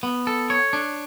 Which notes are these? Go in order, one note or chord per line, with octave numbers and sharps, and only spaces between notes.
B3
A4
C#5
D4